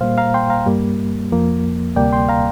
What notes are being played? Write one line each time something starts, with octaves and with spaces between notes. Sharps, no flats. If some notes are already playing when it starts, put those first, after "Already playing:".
A#2 G3 A#3 C5 F5
F5 A#5
G5 C6
F5 A#5
G2 G3 A#3
F2 F3 A#3
D2 C3 G3 A#3 D5 G5
G5 C6
F5 A#5